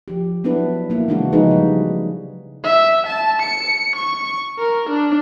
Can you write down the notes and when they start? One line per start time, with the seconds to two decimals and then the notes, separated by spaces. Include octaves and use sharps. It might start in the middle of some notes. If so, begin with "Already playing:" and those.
0.08 F3 G4
0.44 F#3 B3 D4 E4 B4
0.90 A#3 E4
1.08 C#3 E3 G#3 D4 E4 F#4
1.32 C#3 F3 G#3 D#4 G#4 B4
1.51 F#3 G3
2.64 E5
3.07 A5
3.42 C#7
3.96 C#6
4.59 A#4
4.89 D4